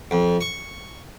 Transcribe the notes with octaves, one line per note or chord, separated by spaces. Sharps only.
F2
C#6